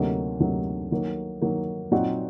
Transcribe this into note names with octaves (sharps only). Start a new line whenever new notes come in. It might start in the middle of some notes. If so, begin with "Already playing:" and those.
Already playing: D2 C3 F#3 A#3 D#4
D2 C3 F#3 A#3 D#4
D#3 F#3 A#3
D#3 F#3 A#3
A#2 F#3 C4 D#4 F#4